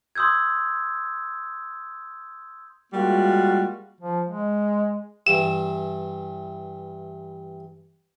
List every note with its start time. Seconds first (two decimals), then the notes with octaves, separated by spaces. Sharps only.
0.15 C6 D#6 E6 G6 G#6
2.93 G3 G#3 A#3 F4 F#4
4.01 F3
4.26 G#3
5.27 G2 E3 E7